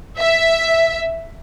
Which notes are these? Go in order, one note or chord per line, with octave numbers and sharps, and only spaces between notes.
E5